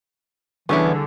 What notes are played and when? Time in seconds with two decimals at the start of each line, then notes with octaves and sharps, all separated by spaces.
0.69 C2 D3 E3 B3 C#4 E4 G#4 C#6